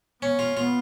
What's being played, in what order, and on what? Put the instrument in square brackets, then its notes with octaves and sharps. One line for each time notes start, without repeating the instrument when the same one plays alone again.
[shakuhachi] B3 [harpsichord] C#4
[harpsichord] F4
[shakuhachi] B3 [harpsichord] F4